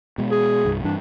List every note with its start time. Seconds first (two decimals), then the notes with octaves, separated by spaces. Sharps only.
0.18 B2 G#3
0.31 G#4
0.65 C2 G2
0.84 G2 E3 D4